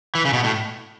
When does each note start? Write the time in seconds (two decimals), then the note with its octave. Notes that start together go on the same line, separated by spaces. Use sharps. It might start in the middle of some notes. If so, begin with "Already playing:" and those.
0.15 E3
0.25 C#3
0.33 B2
0.44 A2